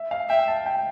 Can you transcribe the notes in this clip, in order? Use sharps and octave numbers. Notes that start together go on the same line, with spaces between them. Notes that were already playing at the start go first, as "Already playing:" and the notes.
Already playing: E5
F5
E5 G5
A5
G5